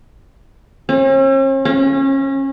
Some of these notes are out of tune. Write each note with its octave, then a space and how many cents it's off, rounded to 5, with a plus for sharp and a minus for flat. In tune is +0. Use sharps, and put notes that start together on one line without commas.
C#4 -45
C#4 -25